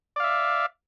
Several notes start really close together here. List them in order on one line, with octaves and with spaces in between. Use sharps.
D5 F5 E5